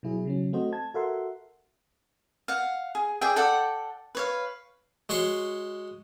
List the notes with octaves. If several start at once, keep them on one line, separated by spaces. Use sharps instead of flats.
B2 F#3 E4 G#4
C#3 F#3 C#4
A3 C4 F#4 C5 D#5
A5 G#6
F#4 A4 A#4 E5 F#5 C6
F5 F#5
G#4
G#4 D5 E5 G5
A4 D5 F#5 G5
B4 C#5 F5
G#3 F#4 C#5 C6 C#6